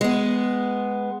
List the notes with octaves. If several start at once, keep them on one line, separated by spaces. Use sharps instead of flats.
G#3 B3